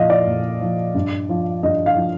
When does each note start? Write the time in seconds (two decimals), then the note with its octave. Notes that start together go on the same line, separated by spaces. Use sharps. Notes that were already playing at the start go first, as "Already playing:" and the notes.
Already playing: A#2 F3 D#5 F5
0.10 D5
0.27 A#2
0.61 F3
0.95 G2
1.29 F3
1.63 G2 D#5
1.86 F5
1.97 F3